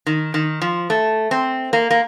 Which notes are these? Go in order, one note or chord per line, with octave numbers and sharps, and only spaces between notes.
D#3
D#3
F3
A3
C4
A#3
A#3